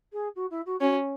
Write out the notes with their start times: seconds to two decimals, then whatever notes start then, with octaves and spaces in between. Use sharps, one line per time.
0.13 G#4
0.35 F#4
0.50 E4
0.66 F#4
0.80 C#4 F#4